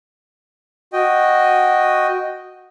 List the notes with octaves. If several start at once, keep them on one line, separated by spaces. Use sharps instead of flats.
F#4 D#5 G5